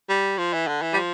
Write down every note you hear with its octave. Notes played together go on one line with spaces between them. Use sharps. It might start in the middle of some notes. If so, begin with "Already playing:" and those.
G3
F3
E3
D3
E3
G3
F3